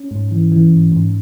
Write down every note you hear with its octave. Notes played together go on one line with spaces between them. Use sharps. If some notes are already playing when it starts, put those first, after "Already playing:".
Already playing: C#4
G#2
E3
E3
G#2
G#2